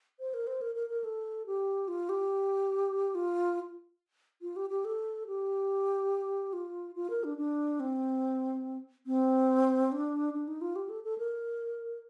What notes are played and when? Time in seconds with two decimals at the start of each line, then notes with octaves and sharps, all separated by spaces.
0.20 C5
0.34 A#4
0.47 C5
0.61 A#4
0.75 A#4
0.90 A#4
1.04 A4
1.46 G4
1.88 F4
2.09 G4
3.15 F4
4.42 F4
4.56 G4
4.70 G4
4.85 A4
5.27 G4
6.53 F4
6.95 F4
7.10 A#4
7.24 D4
7.38 D4
7.80 C4
9.07 C4
9.92 D4
10.34 D4
10.48 D#4
10.61 F4
10.76 G4
10.89 A4
11.04 A4
11.18 A#4